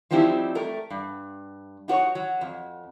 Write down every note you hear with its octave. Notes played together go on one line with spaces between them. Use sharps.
F3 G3 C4 D#4 E4 G4
A3 A#4
G2
D#4 F#4 C5 C#5
F#3
F2